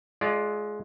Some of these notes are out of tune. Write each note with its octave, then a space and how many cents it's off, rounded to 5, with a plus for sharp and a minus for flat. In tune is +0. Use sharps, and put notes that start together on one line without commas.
G#3 +20 F4 +0 D5 +0